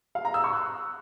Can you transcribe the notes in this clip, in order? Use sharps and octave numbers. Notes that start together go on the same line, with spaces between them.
F5
A#5
E6
C#6
F#6